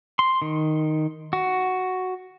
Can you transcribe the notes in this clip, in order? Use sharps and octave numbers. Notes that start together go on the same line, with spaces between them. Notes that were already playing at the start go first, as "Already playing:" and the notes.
C6
D#3
F#4